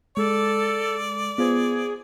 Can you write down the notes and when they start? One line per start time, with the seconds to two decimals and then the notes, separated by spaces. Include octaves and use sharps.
0.17 G#3 A4 D5
1.38 B3 F4 G#4 C5